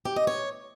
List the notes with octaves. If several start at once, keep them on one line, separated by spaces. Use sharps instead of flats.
G4
D#5
C#5